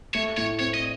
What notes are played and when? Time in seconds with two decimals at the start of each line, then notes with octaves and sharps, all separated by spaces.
0.14 A3 C#5
0.37 A2 C#5
0.59 C4 C#5
0.74 D#5